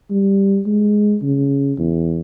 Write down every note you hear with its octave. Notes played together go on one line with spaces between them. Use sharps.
G3
G#3
C#3
E2